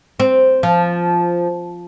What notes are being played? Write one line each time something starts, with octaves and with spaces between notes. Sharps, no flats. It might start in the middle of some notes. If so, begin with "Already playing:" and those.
C4
F3